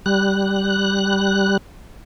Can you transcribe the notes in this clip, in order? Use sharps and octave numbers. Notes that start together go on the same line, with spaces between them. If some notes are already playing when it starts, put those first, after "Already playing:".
G3 F#6